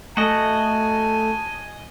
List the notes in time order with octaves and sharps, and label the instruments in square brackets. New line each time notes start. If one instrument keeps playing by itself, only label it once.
[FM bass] A3 [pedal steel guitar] F#4 D#5 [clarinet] G#5 [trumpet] A5